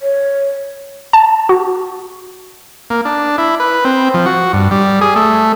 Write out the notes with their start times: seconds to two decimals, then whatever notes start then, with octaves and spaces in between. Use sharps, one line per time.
0.01 C#5
1.13 A5
1.49 F#4
2.90 A#3
3.05 D4
3.38 E4
3.60 B4
3.85 C4
4.14 F3
4.26 F#4
4.53 G2
4.71 G3
5.01 G#4
5.16 A3